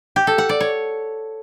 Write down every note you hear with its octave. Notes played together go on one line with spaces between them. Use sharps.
G4
A4
F#5
D5
C#5